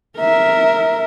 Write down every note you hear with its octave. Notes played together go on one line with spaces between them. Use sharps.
A#4 E5